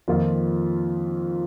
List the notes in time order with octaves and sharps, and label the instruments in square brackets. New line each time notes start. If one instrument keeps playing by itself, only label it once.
[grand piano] F2 D#3 A#3 F4